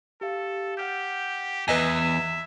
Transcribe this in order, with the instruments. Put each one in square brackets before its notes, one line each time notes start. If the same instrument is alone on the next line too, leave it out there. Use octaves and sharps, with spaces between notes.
[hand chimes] G4 F5 [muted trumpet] A4
[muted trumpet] G4 [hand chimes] F#5 F6 G6
[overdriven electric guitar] E2 [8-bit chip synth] B4 D#5 G#5 [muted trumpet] E5 [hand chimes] A#5 G#6